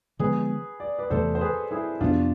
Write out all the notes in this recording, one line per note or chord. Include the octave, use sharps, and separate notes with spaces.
D3 F3 G#3 B3 G#4 B4
D5
B4 D5
E2 C3 E3 A3 A4 C5
C5
G#4 B4
E4 G#4
F2 C3 F3 B3 D4 F4